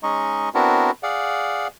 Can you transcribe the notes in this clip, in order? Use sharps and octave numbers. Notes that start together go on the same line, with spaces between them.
G#3 C#4 D#4 D#5 C#6
B3 C4 D4 E4 F#4 A#4
G#4 D5 F5 F#5